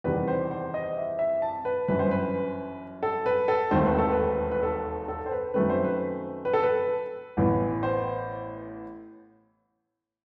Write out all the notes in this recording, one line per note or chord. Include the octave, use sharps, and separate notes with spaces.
E2 C3 D#3 G3 B4
C5
C5
D#5
E5
E5
A5
B4
G1 F#2 E3 B4
C5
B4
A4
B4
A4
E1 D#2 D#3 A3 C4 C5
B4
A4
B4
B4
A4
A4
C5
B4
F#2 D#3 F#3 A3 C4 B4
C5
B4
B4
A4
B4
A1 A2 E3 B3
C5